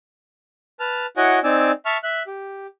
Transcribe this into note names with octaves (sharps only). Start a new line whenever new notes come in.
B4 A5 F6
E4 F#4 C#5 D#5 F#5 G#5
C4 D#4 D5 G#5 E6
E5 A5 C#6 F6
E5 F#6
G4